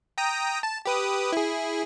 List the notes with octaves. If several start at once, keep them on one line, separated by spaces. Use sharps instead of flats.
G5 A#5 D#6
A5
G4 B4 D#6
E4 G#4